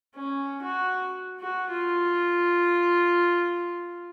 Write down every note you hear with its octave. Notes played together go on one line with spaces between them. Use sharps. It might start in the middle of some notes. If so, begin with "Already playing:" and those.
C#4
F#4
F#4
F4